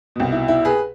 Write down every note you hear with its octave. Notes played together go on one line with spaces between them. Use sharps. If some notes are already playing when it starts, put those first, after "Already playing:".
C2 B2
E4
E4
G#4 B4